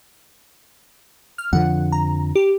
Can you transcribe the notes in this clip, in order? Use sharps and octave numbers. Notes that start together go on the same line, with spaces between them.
F6
F2 D3 F3 F#5
A#5
G4